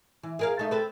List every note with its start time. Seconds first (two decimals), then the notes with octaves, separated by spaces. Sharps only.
0.23 E3
0.39 G#4 A#4 F5
0.59 A3 D#4
0.71 C4 A4 B4